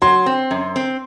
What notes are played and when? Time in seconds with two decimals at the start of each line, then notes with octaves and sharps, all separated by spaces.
0.02 F#3 C6
0.26 C4
0.51 F#2
0.76 C4